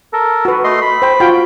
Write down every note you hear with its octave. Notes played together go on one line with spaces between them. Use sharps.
A4 A#4
F#4 B4
A3 D#5 C6
B5
C5 G5
F4 F#4 G5